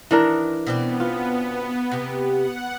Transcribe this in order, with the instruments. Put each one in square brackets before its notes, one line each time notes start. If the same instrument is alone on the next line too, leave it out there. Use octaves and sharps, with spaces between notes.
[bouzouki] D#3 [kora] E3 D4 A#4
[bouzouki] B2 C4 D5 [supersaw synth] B3
[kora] F4
[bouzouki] C3 G4
[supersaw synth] F#5